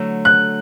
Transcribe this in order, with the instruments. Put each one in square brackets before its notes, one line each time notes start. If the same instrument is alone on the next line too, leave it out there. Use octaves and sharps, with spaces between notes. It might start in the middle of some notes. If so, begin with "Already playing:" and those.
Already playing: [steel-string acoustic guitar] D3 F#3 A3
[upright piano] F#6